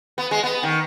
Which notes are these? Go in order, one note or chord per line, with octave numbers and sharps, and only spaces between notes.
B3
G#3
B3
D#3